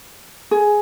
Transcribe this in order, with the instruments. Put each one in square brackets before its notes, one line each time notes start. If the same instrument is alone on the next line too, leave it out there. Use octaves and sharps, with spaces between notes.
[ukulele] G#4